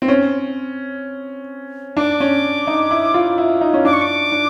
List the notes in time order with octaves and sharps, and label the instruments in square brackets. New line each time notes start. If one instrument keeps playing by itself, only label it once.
[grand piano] C4
C#4
[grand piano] D4 [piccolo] D6
[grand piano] C#4
D#4
E4
F4
E4
D#4
C#4
[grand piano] D4 [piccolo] D6
[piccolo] C#6
D6
[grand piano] D4